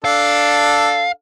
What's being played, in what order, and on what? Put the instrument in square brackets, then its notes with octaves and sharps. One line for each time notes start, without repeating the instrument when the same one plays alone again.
[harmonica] D4 A4 [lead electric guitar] F5